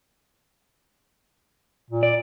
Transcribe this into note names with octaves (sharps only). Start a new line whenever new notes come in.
A#2
D5